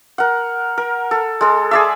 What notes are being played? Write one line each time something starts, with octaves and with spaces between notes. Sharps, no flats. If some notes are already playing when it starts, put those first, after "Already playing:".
A#4 F#5
A#4
A4
G#3 A4
G#4 D5 E5